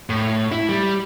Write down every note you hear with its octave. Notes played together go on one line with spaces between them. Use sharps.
A2
E4
G3